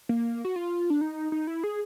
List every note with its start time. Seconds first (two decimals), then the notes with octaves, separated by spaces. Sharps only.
0.09 A#3
0.45 F#4
0.56 F4
0.90 D4
1.01 D#4
1.32 D#4
1.47 E4
1.64 G#4